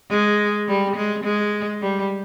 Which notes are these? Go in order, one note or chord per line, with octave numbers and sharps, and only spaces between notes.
G#3
G3
G#3
G#3
G3